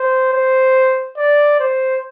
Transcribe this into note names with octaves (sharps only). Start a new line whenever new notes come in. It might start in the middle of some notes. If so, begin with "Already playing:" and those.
Already playing: C5
C5
D5
C5